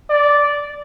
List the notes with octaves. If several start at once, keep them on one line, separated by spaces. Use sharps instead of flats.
D5